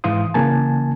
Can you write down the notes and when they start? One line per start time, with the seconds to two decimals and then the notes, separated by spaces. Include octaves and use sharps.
0.04 G#2 E3 F5 C6 D#6
0.34 C#3 E3 A#3 G#5 A5